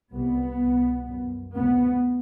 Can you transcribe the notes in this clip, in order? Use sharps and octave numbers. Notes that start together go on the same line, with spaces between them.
C2 C3 B3
C2 B2
F#2
D2 C3 B3